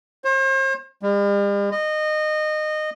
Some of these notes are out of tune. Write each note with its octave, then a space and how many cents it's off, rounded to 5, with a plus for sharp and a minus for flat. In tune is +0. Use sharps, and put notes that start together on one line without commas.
C5 +40
G3 +45
D#5 -20